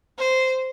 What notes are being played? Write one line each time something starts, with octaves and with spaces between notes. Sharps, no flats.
C5